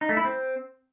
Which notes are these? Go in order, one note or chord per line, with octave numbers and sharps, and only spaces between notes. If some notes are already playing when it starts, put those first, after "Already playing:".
D#4
A3
E4
C4